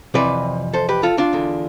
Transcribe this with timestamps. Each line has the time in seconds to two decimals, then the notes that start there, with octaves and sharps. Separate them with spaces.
0.14 F2 C3 E3 B4 D5
0.73 A4 C5
0.89 G4 B4
1.03 F4 A4
1.18 D4 F4
1.33 E2 D3